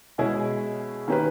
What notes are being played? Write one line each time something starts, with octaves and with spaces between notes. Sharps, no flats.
B2 G#3 C#4 E4 G#4
D#3 A#3 C#4 G4 B4